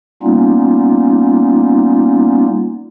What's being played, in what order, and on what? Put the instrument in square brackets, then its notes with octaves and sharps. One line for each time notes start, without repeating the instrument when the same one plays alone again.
[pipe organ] G3 A#3 B3 C#4 D#4 F4